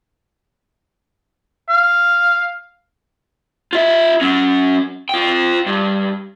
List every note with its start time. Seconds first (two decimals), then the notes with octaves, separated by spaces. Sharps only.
1.69 F5
3.73 F4 E5
4.21 F#3 C#4
5.09 F4 G5
5.66 G2